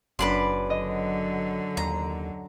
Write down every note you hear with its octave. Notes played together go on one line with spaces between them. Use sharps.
F#1 F#2 D4 B4 D5 C6
D3 F#3 D#5
D#2 A#5